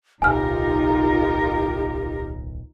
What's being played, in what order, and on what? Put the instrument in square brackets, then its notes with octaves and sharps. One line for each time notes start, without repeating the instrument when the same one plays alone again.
[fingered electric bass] D1 B1 [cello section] D#4 F4 A#4 [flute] G4 [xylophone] G#5 F6